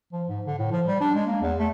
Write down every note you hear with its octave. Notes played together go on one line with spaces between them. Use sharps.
F3
G#2
D3
A2
F3
G3
D4
G#3
A#3
E2
A3